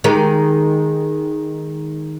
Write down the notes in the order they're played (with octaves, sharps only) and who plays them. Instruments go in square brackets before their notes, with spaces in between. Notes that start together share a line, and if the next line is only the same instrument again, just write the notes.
[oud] D#3 G#3 G4